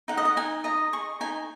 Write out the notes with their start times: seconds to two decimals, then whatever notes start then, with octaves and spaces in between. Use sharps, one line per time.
0.08 D#4 F#5
0.17 D#5
0.25 F#5
0.37 D#4 G#5
0.64 D#5 A#5
0.93 G#4 C#6
1.21 D#4 G#5